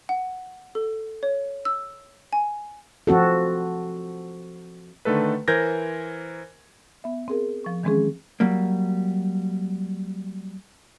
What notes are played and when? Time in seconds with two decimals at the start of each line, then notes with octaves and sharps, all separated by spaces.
0.09 F#5
0.75 A4
1.23 C#5
1.65 E6
2.33 G#5
3.07 F3 C4 F#4 A4
5.05 D3 D#3 A3 A4 B4
5.48 E3 A#4 C5 G6 G#6 A#6
7.04 B3 E5
7.28 C4 G#4 A#4
7.64 F3 C#6
7.83 D#3 E3 G#3 C4 C#4 G#4
8.40 F#3 G3 A#3